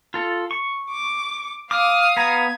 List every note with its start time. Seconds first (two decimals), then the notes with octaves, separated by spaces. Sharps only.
0.14 F4 A4
0.51 C#6
0.91 D6
1.71 F5 D6 D#6 F6
2.17 B3 A#5 G#6